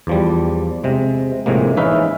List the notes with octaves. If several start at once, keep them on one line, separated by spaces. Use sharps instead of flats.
E2 F3 G3
C3 G#3
A#1 A2 C3 G#3 A#3
E3 C#4 D#4 B4 E5 F5